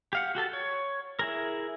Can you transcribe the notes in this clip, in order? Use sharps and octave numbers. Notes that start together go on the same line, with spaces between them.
G4 F5 F#5
F#4 G4 A4 A5
C#5
E4 G#4 A#4